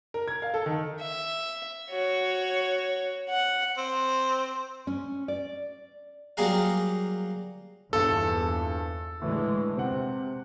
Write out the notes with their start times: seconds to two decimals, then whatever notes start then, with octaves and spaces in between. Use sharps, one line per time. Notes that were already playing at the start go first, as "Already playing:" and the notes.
0.14 A#4
0.28 G#6
0.42 F5
0.54 A4
0.66 D#3
1.01 E5
1.90 F#4 C#5
3.29 F#5
3.77 C4
4.87 C#4
5.28 D5
6.37 F#3 G3 A#3 G#4 A#4 F5
7.93 A#1 E2 G2 A4 E6
9.22 A2 D3 E3 G#3
9.77 C3 C4 F#5